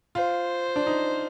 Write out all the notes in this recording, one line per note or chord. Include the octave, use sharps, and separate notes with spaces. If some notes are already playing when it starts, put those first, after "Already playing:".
F4 C5
D4
D#4